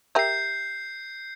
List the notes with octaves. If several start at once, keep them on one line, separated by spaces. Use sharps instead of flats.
G4 A#4 E5 G6 C7